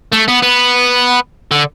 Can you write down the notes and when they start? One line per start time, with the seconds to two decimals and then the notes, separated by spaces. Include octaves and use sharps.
0.12 A3
0.28 B3
0.42 B3
1.51 D3